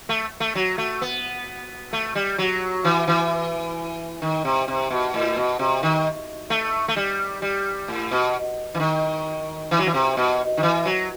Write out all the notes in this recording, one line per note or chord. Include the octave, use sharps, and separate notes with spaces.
A3
A3
F#3
A3
B3
A3
G3
F#3
E3
E3
D#3
C3
C3
B2
A2
B2
C3
D#3
A3
A3
G3
G3
A2
B2
E3
D#3
E3
F#3
E3
C3
B2
D#3
E3
F#3